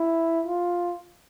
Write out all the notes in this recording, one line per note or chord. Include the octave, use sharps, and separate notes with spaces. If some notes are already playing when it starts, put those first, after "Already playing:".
Already playing: E4
F4